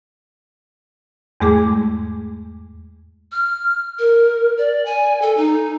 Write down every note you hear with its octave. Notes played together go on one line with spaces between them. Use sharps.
E2 G#2 G#3 A3 G#4 D6
F6
A#4
D5
G#5
A4
D#4